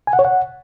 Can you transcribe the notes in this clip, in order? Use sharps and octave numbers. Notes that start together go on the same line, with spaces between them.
G#5
F#5
C#5
F#5